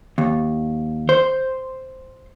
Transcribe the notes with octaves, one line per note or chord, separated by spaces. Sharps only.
D#2
C5